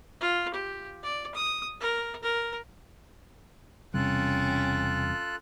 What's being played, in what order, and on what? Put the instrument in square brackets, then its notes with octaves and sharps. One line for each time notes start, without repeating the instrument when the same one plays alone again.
[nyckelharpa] F4
G4
D5
D#6
A#4
A#4
[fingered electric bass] E1 C3 G3 [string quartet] C#4 G5 [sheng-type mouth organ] F4 A4 F#6